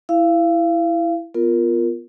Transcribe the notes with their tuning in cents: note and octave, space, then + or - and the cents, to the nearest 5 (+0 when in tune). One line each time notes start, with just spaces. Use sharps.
E4 +5 F5 -30
B3 +0 F4 +0 A#4 +0